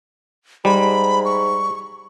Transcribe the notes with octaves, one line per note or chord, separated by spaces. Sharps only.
G#2 G3 B5
C#6